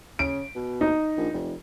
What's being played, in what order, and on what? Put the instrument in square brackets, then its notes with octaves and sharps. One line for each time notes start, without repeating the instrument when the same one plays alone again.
[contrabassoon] C#3 [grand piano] D7
[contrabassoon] B2
[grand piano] D#4
[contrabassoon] A#1
F1